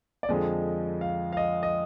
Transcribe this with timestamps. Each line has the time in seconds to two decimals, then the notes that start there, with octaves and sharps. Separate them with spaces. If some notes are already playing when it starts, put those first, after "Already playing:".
0.23 D5
0.28 F2 D3 F3 G#3 D#5
1.01 F5
1.33 F5
1.37 D#5
1.63 D#5